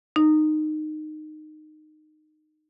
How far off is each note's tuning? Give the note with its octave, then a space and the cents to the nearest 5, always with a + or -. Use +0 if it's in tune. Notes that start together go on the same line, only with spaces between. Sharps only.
D#4 -15